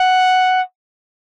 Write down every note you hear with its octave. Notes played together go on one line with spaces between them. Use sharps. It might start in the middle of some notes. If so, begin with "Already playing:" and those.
Already playing: F#5